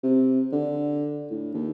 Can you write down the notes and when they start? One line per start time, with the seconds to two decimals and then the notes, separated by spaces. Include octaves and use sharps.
0.03 C3
0.52 D3
1.30 A2
1.54 D#2